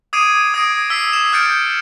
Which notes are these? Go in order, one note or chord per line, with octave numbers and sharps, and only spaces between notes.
D6 D#6 G#6 C7 D7 D#7
D#6 G#6 A#6 C7 D7
E6 B6 C7
E7 F#7
E6 F6 G6 A6 C#7 D7